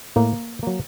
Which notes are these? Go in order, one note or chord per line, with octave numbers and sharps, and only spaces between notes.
A2 A#3
F#3 A#3